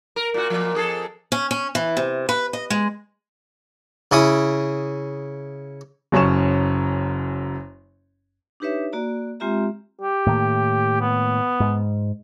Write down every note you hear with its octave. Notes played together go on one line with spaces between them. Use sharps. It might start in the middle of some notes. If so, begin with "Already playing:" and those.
A#4
A#2 F#4
F2 A#2 F3
F2 G#4 A4
C#4
C#4
E3
C3
B4
D#5
G#3
C#3 E4 D#6
F#1 F#2 C#4 C#6 E7
D4 D#4 G4 B4 C#5 E5
A#3 F#4 D5 A#5
G#3 C4 F4 G4 E5 A#5
G4
A2 D#3 A#3
B3
G#2